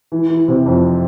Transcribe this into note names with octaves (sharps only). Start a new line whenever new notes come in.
E3
E3
C3
F2